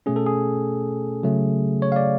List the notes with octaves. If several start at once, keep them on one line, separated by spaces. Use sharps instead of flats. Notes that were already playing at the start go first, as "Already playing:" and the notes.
B2 A3 C#4 G#4
A4
G#4
C#3 F#3 A3
C#5
F5
D5